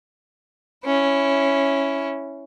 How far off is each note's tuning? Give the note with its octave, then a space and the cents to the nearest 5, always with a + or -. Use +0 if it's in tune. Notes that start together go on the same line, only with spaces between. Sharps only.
C#4 +0 E4 +0